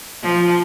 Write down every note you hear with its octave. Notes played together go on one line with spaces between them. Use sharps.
F3